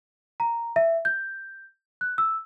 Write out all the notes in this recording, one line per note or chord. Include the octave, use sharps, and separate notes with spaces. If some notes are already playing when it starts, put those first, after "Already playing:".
A#5
E5
G6
F#6
E6